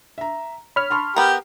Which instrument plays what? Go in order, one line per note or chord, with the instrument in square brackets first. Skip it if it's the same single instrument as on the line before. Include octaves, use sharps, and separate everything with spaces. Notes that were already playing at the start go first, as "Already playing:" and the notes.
[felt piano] E5 A#5
[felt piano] C#5 [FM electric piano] B5 F6
[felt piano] A5 C6 C#6
[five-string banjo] B3 A#4 [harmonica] G4